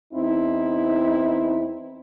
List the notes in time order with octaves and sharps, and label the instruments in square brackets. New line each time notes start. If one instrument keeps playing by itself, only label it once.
[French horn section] E2 C4 D#4 E4